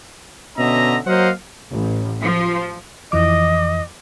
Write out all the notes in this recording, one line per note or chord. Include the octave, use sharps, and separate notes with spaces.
B2 D3 C#4 D#5 E5 A#5
F#3 A#3 C5 D#5 F5 F#5
A1
F3
F2 E3 D#5 D6